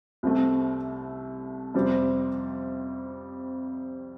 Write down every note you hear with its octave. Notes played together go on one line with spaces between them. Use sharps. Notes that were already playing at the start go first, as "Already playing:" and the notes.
C2 C3 A3
F2 C3 G3 C4 G4